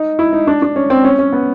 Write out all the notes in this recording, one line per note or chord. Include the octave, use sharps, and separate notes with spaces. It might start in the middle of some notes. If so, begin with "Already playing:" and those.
Already playing: D#4
E4
D#4
D4
D4
C#4
C4
C#4
C#4
B3